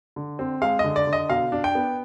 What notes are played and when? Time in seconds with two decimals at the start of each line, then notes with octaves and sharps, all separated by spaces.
0.16 D3
0.39 C4
0.62 G#3 F5
0.79 D3 D#5
0.96 D5
1.07 D3
1.13 D#5
1.29 B2 F5
1.52 D4
1.64 G5
1.75 B3